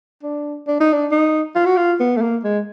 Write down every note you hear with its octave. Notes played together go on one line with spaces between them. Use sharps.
D4
D4
D#4
D4
D#4
F4
F#4
F4
B3
A3
A#3
G#3